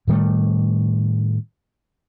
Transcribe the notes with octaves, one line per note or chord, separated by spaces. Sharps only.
A2 D#3 G3 A3